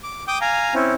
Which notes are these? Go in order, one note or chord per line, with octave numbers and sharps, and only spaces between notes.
D6
G5 D6 D#6 G6
F5 G#5 A#5
C4 C#4 E4